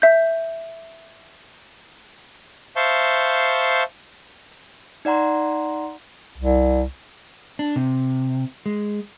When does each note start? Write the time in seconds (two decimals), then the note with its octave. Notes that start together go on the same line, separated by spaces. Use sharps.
0.02 E5 G6
2.76 C5 E5 F5 A5 C#6 G6
5.05 D#4 D5 F#5 A#5 C6
6.38 C2
7.59 D4
7.76 C3
8.66 G#3